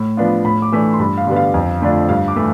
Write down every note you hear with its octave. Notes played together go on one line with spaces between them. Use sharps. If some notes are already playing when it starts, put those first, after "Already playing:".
Already playing: A2
F3 B3 D4 F4
A2 B5
D6
E3 A3 D4
C6
G2 B5
F5
D3 G3 B3
F5
F2
D3 A3 D4 F4
G2 F5
D6
E3 A3